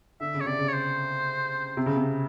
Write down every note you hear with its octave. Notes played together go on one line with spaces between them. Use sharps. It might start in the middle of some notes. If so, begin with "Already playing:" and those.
D3 E5
C#3
C#5
C3 D5
C#3
C#5
C5
C3
C#3
C3